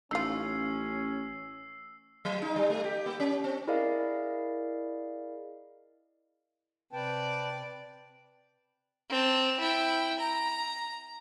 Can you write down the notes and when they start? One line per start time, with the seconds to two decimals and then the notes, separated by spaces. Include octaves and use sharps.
0.11 A1 C#4 D#4 F4 E6 C7
2.25 F#3
2.42 D#4
2.56 G3
2.70 A3
2.84 G4
3.06 A#3
3.20 C#4
3.44 C4
3.68 E4 G#4 A#4 D5 D#5 F5
6.93 C3 B4 D5 G5 A5
9.10 C4 A5
9.60 E4 G5
10.19 A#5